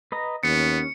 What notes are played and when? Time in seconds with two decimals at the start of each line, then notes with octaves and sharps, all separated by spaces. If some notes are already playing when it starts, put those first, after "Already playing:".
0.12 B4 D#5 A#5
0.43 D#2 B3 C#4 C#7